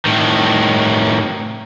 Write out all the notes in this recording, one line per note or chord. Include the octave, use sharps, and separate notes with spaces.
A2 D#3